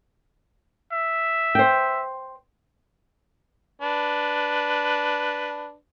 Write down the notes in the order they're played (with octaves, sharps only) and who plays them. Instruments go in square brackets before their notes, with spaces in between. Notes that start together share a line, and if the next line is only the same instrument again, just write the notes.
[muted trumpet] E5
[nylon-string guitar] C5 G5
[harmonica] D4 B4